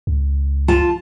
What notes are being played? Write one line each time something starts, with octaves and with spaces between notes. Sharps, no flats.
C#2
F4 A5